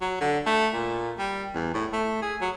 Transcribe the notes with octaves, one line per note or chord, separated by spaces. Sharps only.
F#3
D3
A3
A#2
G3
E2
A2
A3
G#4
F#3